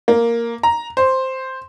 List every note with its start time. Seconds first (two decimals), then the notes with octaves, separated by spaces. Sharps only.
0.08 A#3
0.63 A#5
0.97 C5